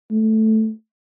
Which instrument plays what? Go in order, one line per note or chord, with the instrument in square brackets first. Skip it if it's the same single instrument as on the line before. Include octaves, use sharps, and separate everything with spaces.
[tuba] A3